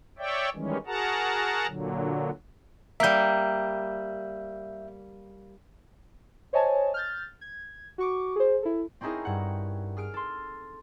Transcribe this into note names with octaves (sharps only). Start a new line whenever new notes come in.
C#5 D5 E5 G5
D#3 E3 G3 G#3 C#4
F#4 G#4 A#4 F#5 A5 A#5
A#2 D3 F#3
G3 A#3 E5 G6
C5 C#5 D#5 G#5 A5
F6 G6 A6
G#6
F#4 C#6 D6
G#4 C5
E4 A4
C4 C#4 D#4 E4 G#4 A#4
G2 F#5
G#4 F6 D7
A4 C6